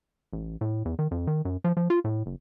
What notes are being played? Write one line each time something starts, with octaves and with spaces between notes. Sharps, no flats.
A1
A2
E2
D#3
F2
D#3
F#2
F3
F3
F4
A2
F#1